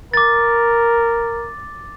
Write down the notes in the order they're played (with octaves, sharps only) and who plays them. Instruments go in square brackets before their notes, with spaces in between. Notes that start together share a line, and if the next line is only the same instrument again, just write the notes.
[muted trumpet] A#4 [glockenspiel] D6 A6